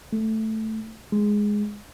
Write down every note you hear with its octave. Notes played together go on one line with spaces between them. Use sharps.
A3
G#3